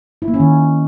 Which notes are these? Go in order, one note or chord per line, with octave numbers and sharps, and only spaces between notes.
E4
A#3
C#4
D#3